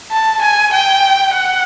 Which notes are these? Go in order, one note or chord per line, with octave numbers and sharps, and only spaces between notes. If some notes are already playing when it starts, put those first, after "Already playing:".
A5
G#5
G5
F#5